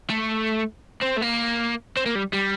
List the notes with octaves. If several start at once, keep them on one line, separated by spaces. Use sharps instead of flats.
A3
C4
A3
A#3
C4
A#3
G3
G3